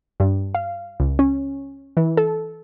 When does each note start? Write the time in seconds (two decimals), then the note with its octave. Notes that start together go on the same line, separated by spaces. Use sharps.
0.20 G2
0.55 F5
1.00 C#2
1.19 C#4
1.97 E3
2.17 A4